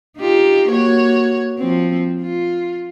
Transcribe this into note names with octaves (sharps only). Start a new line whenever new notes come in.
D#4 F4 G4
A#3 F#4 C#5
F3 C4
F4